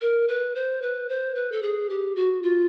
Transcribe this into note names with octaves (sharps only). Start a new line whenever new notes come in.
A#4
B4
C5
B4
C5
B4
A4
G#4
G4
F#4
F4